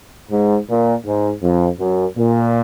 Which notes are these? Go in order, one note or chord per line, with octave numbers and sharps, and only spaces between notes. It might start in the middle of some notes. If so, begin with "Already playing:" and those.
G#2
A#2
G#2
F2
F#2
A#2